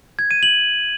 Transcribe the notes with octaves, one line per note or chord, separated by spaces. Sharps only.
G#6
D#7
F#7